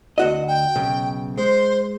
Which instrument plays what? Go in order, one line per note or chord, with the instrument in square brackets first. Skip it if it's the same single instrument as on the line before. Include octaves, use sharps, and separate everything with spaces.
[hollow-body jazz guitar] D2 F#4 D#5 [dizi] F#5
[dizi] G5
[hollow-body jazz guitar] B1 C#3
[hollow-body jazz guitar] G#3 [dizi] C5